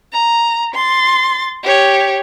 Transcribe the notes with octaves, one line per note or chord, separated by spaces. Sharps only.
A#5
C6 A6
G4 C#5